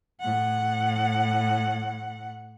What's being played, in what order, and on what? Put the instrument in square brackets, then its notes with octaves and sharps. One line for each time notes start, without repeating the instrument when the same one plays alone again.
[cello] A2 F#5